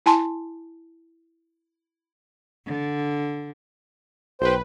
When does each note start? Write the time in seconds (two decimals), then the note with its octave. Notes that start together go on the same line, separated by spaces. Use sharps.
0.06 E4 G#5 A5 C6
2.66 D3
4.41 B1 B4 C5 G5